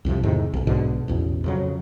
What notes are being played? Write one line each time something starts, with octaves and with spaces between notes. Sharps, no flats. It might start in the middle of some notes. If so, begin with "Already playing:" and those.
C2 F2 C3 F3
E2 G#2 C3 D#3
B1 F2
B1 G#2 B2 D3
A1 E2 B2
F2 C#3 F#3